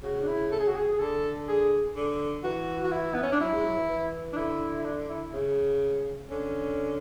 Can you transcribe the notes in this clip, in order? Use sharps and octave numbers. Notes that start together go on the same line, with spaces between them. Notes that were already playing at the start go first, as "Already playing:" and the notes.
C#3 F#4
D4
E4
A4
G#4
F#4
G#4
G#4
D3 A4
G#4
D3
E3 F#4
F#4
E4
B3
C#4
D4
F#3 E4
G#3
F#3
E3
E3
D4
D3 E4
E4
D4
E4
C#3
D3 C#4